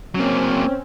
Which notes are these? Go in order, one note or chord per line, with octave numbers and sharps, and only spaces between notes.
F#3 A#3 C4 C#4